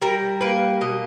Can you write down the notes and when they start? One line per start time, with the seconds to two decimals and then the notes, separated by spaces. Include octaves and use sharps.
0.02 G3 A#4
0.41 A#3 B4
0.81 B2 D#5